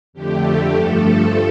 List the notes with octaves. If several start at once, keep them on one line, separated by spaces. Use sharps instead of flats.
F2 D3 A3 G4
G2 F3 A3 A4